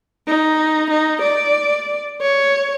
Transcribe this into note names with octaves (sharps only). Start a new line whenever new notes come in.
D#4
D#4
D5
C#5